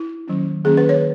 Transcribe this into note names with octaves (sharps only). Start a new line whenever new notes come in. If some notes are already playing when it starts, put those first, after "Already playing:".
Already playing: E4
D#3 F#3 A#3 C#4
D#3 F#3 A#3 C#4 G#4
B4
C#5